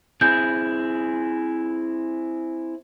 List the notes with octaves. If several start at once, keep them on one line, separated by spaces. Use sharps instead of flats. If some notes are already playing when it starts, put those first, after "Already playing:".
C4 E4 G#4 G6